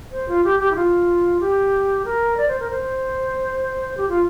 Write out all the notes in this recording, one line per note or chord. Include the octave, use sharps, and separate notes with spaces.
C5
F4
G4
G4
E4
F4
G4
A#4
D5
C5
A#4
C5
G4
F4